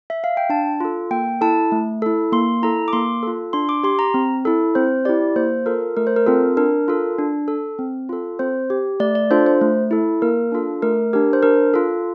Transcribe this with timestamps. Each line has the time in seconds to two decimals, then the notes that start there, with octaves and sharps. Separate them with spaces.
0.10 E5
0.24 F5
0.37 G5
0.50 D4 A5
0.80 F4 A4
1.11 A#3 G5
1.41 E4 A4 A5
1.72 A3
2.02 E4 A4
2.32 A#3 C6
2.62 E4 A4 A#5
2.88 D6
2.93 A#3 C6
3.23 F4 A4
3.53 D4 C6
3.69 D6
3.84 G4 C6
3.99 A#5
4.14 C4
4.45 E4 A4
4.75 C4 C5
5.05 E4 G4 D5
5.36 A#3 C5
5.66 F4 A4 A#4
5.97 A3 A#4
6.07 C5
6.16 A#4
6.26 C4 F4 A4
6.57 D4 A#4
6.88 F4 A4
7.18 D4
7.48 A4
7.79 C4
8.09 F4 A4
8.39 C4 C5
8.70 G4
9.00 A3 D5
9.15 D5
9.31 D4 F4 A4 C5
9.46 C5
9.61 A3
9.91 E4 A4
10.22 A#3 A#4
10.52 D4 F4 A4
10.82 A3 A#4
11.13 D4 G4 A#4
11.33 C5
11.43 D4 A#4
11.74 F4 A4